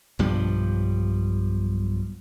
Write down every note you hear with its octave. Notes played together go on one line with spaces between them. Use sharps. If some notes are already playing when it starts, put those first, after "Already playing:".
B1 G2 F3 G3